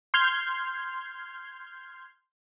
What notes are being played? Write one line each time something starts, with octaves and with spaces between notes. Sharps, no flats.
C6 F6 G6 G#6